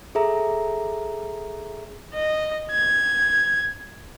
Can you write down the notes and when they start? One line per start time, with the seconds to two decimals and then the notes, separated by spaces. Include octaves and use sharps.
0.15 G#4 A4 E5 A#5
2.15 D#5
2.71 G#6